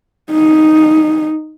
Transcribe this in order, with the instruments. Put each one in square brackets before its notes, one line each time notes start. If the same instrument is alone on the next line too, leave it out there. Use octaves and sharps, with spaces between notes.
[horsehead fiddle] D#4